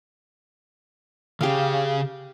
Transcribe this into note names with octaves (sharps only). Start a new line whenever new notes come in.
C#3 G4 G#4 F5